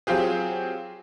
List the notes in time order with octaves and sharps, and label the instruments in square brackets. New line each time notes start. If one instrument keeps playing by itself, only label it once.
[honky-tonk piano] F#3 C4 F4 G4 G#4